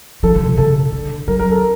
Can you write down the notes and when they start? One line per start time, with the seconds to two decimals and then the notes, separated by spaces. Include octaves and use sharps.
0.23 F3 A4
0.34 D3
0.46 C3
0.57 C#3 A4
0.92 D3
1.28 F#3 A#4
1.39 A#4
1.51 A4